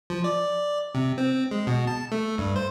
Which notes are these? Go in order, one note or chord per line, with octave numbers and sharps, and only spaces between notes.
F3
D5
C3
C4
G#3
B2
A5
A3
G2
C5